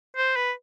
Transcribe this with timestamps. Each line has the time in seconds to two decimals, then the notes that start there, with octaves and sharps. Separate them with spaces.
0.17 C5
0.36 B4